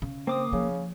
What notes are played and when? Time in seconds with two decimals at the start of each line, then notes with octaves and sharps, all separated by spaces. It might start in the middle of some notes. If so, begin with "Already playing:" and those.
0.02 C#3
0.27 A#3 C4 D6 D#6
0.53 C#3 F3